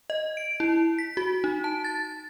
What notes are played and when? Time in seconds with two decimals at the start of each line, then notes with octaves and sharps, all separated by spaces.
0.10 D#5
0.37 D7
0.60 E4
0.98 B6
1.17 F#4
1.44 D#4
1.64 A5
1.84 A6